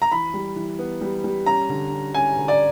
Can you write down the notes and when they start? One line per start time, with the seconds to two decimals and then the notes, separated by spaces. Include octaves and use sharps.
0.02 A#5
0.12 E3 B5
0.34 G3
0.56 E3
0.79 B3
1.01 G3
1.24 G3
1.46 C#4 A#5
1.69 D3
1.92 C#4
2.14 C#4 G#5
2.37 D3
2.48 D5